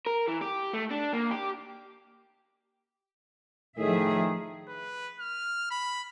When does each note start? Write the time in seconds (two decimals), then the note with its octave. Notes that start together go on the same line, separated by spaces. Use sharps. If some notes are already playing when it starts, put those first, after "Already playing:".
0.06 A#4
0.28 E3
0.42 G4
0.73 A3
0.90 D4
1.13 A#3
1.31 G4
3.78 A2 D#3 F3 G#4 E5
4.68 B4
5.19 F6
5.71 B5